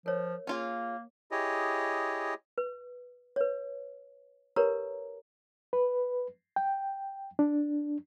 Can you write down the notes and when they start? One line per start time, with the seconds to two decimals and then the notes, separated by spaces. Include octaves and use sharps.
0.06 F3 A#4 C#5
0.47 A#3 C#4 F4 G#4
1.31 E4 G4 G#4 C#5 D#5
2.58 B4
3.36 B4 C#5
4.56 G4 A#4 B4 C#5 A#5
5.73 B4
6.56 G5
7.39 D4